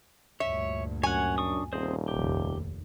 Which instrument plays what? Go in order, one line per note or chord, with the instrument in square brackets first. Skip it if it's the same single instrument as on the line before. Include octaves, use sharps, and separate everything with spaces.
[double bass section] D2 G2 A#2 [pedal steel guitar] C#5 [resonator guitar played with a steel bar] E5
[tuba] F#2 [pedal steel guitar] C#5 F#5 [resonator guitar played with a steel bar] G#5
[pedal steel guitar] D4 C#6 D#6
[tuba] D#1 [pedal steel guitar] C4 G#4 C5
[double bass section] F1 A#1 D#2 [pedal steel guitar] G4